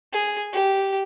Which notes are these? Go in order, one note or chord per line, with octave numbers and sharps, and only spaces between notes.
G#4
G4